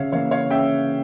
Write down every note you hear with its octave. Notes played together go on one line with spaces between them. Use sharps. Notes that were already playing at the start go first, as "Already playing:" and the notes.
Already playing: C#3 C#5 E5 F5
E3 A#3 C#5 F5
C#5 F5
C#3 E5 G5